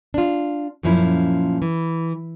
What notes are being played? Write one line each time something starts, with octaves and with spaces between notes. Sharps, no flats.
D4 F4
F#2 A#2 F3 C#4 E4
E3